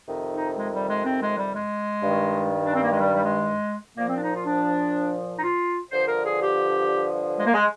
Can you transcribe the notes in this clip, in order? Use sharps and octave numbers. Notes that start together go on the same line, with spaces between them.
F2 C3 D#3
D#4
G#3
G3
G#3
C4
G#3
G3
G#3
G2 D#3
D4
C4
A#3
G#3
G3
G3
G#3
A#2 F3 A#3
C4
D4
D#4
F4
D4
D#4
F4
G2 D3 F3 C5
A#4
G#4
G4
G#3
A#3
G#3